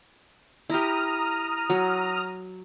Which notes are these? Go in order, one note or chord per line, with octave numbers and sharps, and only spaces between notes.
E4 G4 A#5 D#6 F6
F#3